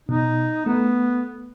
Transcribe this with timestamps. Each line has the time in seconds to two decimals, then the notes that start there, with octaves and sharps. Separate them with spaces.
0.09 B2 D#4
0.66 A3 B3